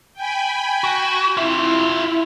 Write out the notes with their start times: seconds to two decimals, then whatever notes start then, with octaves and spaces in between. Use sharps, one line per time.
0.13 G5 G#5 B5
0.84 F#4
1.37 E4 F4 E5